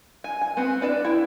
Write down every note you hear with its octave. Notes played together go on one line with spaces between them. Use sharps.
G#5
G#5
B3 C4
D4 B4 D5 A5
E4 G5